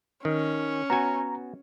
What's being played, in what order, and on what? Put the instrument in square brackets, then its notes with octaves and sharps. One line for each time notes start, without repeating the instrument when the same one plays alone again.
[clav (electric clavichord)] D#3 [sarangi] C#4
[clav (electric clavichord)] B3 F#4 G#5 [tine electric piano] A#5